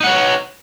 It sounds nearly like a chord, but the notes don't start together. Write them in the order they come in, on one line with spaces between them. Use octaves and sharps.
D#4 F#5 C#5 B4